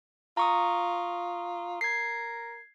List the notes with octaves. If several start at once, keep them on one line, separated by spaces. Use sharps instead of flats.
F4 A#5 C#6 D#6
A#4 G#6 C7